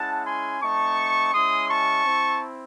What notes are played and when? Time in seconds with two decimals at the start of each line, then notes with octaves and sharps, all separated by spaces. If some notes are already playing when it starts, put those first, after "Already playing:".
Already playing: G#3 C#4 E4 F#5 A5
0.25 G#5 C6
0.61 A3 C4 D#4 A5 C#6
1.33 G#3 C#4 E4 C6 D#6
1.68 A5 C#6
2.04 C4 E4